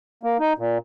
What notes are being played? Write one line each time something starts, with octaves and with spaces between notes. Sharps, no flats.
A#3
D#4
A#2